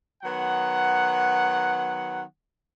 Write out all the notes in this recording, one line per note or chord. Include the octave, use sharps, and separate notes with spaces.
D#3 F#3 B3 F#5